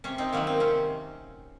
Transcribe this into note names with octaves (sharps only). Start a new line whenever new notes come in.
C3 C#4
C4 D#4
D#3 F#3 A#3 C#4
C4
C3 C#4